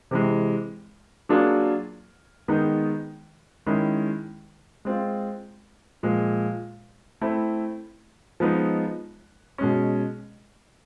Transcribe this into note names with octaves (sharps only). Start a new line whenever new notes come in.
C3 E3 G#3
F#3 A#3 D4 F4 G#4
D#3 G#3 B3 D#4
D#3 G#3 C#4 E4 G#4
G#3 C4 F4
A#2 F3 G#3
A3 C4 E4
F3 G#3 B3 D#4
B2 G#3 C#4